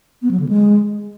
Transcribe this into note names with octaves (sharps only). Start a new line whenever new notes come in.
B3
F#3
D3
G#3